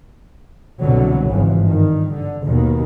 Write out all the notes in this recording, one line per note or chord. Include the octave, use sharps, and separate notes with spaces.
C2 B2 D3 F#3
G#1 C#3 E3 F3
G2 D#3
D3
D#2 B2 D#3